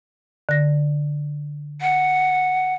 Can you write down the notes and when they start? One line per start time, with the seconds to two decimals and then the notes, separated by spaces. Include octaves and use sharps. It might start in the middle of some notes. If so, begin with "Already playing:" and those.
0.49 D3 A#6
1.82 F#5